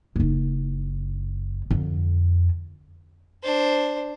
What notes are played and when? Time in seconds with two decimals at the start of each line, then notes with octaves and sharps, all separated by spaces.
0.16 F#1 D#4
1.71 F2 D3
3.43 D4 C5